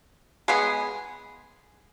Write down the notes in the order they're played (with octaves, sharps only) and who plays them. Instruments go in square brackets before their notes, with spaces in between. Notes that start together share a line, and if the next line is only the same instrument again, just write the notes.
[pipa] G#3 B3 G#4